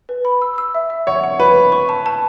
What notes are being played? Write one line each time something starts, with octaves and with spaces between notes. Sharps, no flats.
B4
B5
E6
E6
E5
E5
C#5 F#5
F#5
B4 B5
B5
C#6
A5
A5